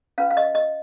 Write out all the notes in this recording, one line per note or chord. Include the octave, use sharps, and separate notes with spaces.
C#4 F4 B4 F5
F5
D#5
D#5